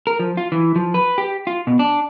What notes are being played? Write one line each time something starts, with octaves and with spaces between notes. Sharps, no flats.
A#4
F3
F4
E3
F3
B4
G4
F4
B2
D4